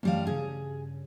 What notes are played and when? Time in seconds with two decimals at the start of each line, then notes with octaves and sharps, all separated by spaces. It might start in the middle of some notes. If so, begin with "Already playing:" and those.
0.03 F#2 E3 G3 A3 F5
0.27 G2 C#3 G#4